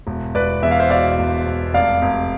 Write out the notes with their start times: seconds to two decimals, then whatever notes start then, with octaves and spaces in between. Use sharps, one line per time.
0.07 E1
0.35 E1 B4 D5
0.63 E2 E5
0.71 F5
0.80 C5 E5
0.90 B2 D5 F5
1.19 E1
1.47 E1
1.74 F1 D5 F5
2.02 F1